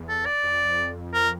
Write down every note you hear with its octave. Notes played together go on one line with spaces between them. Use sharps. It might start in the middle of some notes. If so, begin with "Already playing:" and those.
Already playing: E2
A4
D5
F2
A#4